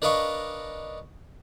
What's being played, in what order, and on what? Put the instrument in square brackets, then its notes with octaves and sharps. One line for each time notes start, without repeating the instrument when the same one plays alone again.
[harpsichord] D4 A#4 B4 D#5 F5 C#6